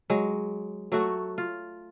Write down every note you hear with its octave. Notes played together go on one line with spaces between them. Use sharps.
F#3 G#3
F#3 A3 F#4
F4